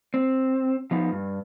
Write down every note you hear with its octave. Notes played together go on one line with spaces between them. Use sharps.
C4
F3 B3 D#4
G2